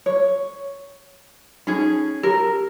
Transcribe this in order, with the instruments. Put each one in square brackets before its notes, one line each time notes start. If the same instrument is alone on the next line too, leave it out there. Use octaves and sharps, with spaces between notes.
[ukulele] C#5
[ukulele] C#4 G#4 [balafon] D#4
[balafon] G4 [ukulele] A#4